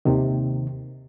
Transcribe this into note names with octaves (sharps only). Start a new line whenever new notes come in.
D#2 C3 D#3